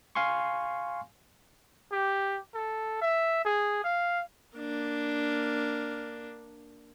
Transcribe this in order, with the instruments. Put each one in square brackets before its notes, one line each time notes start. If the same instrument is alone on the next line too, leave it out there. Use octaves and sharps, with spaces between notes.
[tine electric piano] F5 G#5 C6 C#6
[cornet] G4
A4
E5
G#4
F5
[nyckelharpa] A#3 D4